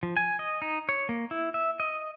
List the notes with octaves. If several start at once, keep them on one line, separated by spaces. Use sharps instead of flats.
F3
G#5
D#5
D#4
C#5
A#3
E4
E5
D#5